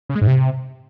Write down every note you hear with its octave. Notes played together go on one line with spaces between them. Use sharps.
C#3
G#3
G#2
C3